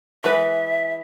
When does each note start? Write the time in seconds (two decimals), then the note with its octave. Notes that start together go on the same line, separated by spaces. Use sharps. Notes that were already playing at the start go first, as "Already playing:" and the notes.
0.24 E3 G#3 B4 E5